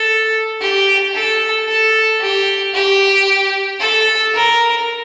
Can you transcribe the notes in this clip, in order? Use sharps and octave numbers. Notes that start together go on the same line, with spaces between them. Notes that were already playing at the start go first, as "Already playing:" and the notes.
Already playing: A4
G4
A4
A4
G4
G4
A4
A#4